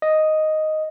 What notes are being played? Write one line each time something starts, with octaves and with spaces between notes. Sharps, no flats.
D#5